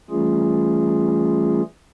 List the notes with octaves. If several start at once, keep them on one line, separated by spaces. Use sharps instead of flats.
E3 G3 A3 C#4 F4 G#4